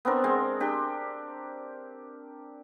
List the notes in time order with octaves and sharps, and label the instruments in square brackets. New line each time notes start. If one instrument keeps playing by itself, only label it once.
[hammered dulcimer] B3 C4 D4 A#4
G#3 C4
D4 G4